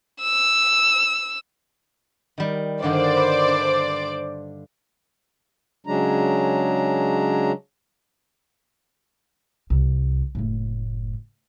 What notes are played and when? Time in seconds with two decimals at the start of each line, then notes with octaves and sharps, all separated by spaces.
0.22 E6
2.38 D#3 G3
2.83 G2 D3 D#3 C5 D5 D6
3.17 B4
3.48 D4
5.87 C#3 F#3 G#3 D4 A#5
9.70 C2
10.35 F#1 A2